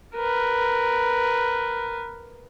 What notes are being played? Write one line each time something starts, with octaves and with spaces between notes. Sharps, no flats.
A#4 B4